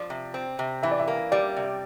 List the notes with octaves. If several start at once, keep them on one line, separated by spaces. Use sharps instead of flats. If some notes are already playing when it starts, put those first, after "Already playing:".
Already playing: F3 D5
C3
C4
C3
E3 E5
D5
E5
A#3
G3 D5
C3